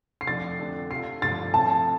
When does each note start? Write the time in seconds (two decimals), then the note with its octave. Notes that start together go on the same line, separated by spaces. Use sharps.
0.21 C7
0.27 F2 F3 A3 D4 A6
0.59 F2 D3 A3 D4 A4
0.91 C3 A3 F4 A4 C7
1.22 G2 D3 F3 D4 F4 A6
1.53 A2 F3 C4 A4 A5